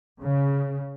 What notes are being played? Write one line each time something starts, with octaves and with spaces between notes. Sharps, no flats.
C#3